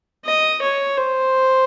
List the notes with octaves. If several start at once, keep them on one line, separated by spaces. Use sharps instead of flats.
D#5
C#5
C5